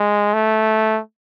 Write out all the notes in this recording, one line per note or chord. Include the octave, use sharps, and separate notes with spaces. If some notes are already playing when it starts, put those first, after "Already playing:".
Already playing: G#3
A3